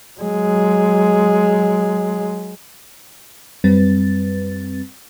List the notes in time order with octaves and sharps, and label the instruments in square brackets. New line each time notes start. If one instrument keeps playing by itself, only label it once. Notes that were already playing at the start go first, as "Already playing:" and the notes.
[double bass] F#3 G#3
[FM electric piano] F#2 G3 C4 B4 A6